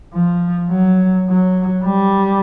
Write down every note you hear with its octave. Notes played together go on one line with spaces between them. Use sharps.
F3
F#3
F#3
G3